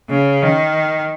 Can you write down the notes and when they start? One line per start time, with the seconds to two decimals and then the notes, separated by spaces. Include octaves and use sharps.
0.09 C#3
0.42 D#3